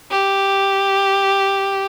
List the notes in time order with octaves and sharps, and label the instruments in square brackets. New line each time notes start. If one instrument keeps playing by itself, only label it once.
[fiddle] G4